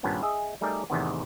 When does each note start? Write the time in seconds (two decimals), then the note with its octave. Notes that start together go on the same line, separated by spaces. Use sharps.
0.03 G#1 G2 A#2 B3 C#4 D4
0.22 G#4 D#5 E5
0.61 G3 A3 D#4 G#4 A#4 D5
0.90 A1 E2 C3 D#3 B3